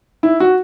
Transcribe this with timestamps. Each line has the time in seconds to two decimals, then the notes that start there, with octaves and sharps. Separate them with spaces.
0.23 E4
0.40 F#4